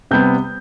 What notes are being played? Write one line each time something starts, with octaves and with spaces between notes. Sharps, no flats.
C3 G3 B3 G6